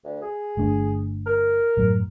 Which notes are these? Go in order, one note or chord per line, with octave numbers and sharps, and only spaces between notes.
D2
G#4
G1 A3 D4
A#4
F#2 A2 F#3